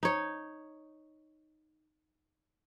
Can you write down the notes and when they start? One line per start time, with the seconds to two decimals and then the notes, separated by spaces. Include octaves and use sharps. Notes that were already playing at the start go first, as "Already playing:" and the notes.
0.03 D#4 C#5